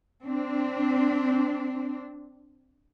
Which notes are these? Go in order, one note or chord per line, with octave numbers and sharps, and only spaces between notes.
C4 D4